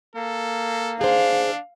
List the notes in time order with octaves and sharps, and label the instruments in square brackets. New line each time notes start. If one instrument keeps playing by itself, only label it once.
[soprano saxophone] A#3 [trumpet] A4
[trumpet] D4 [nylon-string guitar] G#4 C5 [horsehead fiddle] F5